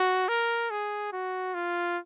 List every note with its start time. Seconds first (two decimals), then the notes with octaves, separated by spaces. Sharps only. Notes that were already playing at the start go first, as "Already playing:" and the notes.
Already playing: F#4
0.28 A#4
0.71 G#4
1.12 F#4
1.54 F4